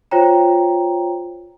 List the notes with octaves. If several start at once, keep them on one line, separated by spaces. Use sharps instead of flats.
F4 C5 C#5 G5 A#5